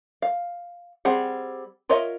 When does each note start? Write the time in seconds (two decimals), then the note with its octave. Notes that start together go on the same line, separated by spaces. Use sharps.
0.22 F5
1.05 G3 C4 G#4 F#5
1.89 F4 A#4 C#5 D#5 E5